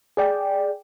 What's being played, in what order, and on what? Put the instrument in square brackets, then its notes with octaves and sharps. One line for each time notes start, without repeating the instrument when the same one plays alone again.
[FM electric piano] G#4 D5 G5